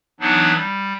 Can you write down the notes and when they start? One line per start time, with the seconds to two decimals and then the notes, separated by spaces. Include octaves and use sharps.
0.20 E3 F#3 B3 D4 D#4
0.56 G3